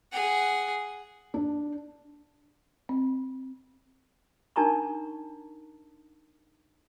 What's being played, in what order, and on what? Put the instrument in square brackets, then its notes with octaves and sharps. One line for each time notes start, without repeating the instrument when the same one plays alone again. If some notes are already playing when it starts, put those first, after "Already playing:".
[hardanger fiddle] G#4 F#5
[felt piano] D4
[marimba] C4
[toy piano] D4 D#4 A#4 A5 A#5 C#6